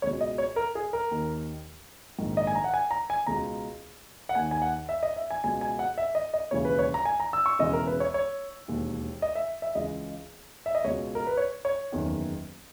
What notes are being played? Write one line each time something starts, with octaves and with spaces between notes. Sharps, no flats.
C#2 B2 C#5
D#5
C#5
A#4
G#4
A#4
D#2 D#3
A#1 G#2 D#3
D#5
G#5
A#5
F#5
G#5
A#5
G#5
C#2 B2 A#5
F#5
D#2 D#3 G#5
G#5
F#5
E5
D#5
E5
G#5
C#2 B2 G#5
G#5
F#5
E5
D#5
D#5
E1 D#2 C#3 E3 C#5
B4
C#5
A#5
G#5
A#5
E6
C#6
E1 E2 C#3 E3 D#5
A#4
B4
C#5
C#5
E1 D#2 D#3
D#5
E5
E5
C#2 C#3 E3 D#5
E5
D#5
C#2 B2 C#5
A#4
B4
C#5
C#5
F#1 E2 D#3